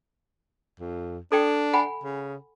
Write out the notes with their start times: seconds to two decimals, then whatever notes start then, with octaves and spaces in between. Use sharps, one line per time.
0.80 F2
1.32 D4 A4 D5 G5
1.73 F#5 G#5 B5
2.03 C#3